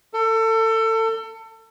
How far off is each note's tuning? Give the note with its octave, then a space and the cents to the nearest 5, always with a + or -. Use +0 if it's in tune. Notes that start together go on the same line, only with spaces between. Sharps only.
A4 +30